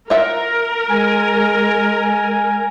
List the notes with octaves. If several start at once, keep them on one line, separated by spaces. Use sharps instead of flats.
F4 A#4 E5 F#5
G#3 G#5